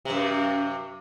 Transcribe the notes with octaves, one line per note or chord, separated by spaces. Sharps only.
F#2 C3